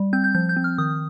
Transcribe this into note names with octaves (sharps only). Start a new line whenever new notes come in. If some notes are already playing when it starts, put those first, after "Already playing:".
Already playing: G3
C4 G6
G6
F3 G6
G6
C4
F6
D#3 D#6